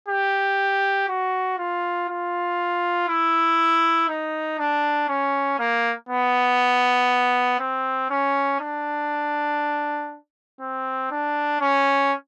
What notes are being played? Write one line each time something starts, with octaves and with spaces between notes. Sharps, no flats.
G4
F#4
F4
F4
E4
D#4
D4
C#4
A#3
B3
C4
C#4
D4
C4
D4
C#4